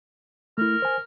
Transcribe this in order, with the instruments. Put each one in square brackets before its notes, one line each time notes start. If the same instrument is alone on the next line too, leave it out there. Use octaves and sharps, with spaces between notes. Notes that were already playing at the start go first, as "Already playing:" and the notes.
[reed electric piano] A3 E4 [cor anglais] A#4
[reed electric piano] C5 G#5